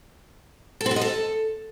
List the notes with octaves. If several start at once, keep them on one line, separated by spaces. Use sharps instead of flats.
A4
C4
F#4
D#5
A4